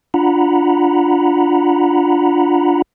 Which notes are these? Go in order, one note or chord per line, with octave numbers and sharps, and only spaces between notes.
D4 F4 F#5 A#5 B5